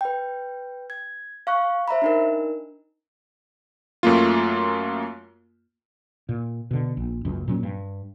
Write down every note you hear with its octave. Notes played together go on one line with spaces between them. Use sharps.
B4 G5
G#6
F5 C#6 F#6
C5 E5 A#5 B5
D4 D#4 A#4
F#2 A3 A#3 F4
A#2
B2 D3
A#1
F#1 C#2 F#2
A#2 F#3 C#4
G2